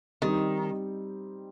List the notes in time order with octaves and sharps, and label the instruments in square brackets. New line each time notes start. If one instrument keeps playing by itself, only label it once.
[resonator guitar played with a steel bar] D#3 [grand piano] G3 C4 D#4 G4